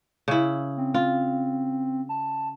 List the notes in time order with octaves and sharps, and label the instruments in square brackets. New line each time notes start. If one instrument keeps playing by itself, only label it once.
[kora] C#3 E4
[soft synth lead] C4
[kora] F4
[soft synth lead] A5